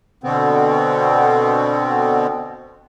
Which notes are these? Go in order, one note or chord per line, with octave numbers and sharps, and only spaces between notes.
B2 D3 B3 C4